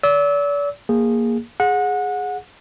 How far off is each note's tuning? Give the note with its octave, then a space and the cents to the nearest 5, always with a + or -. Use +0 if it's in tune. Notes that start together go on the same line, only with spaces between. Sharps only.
D5 -40 E6 -25
A#3 +0 G#4 -15
G#4 +0 F#5 -25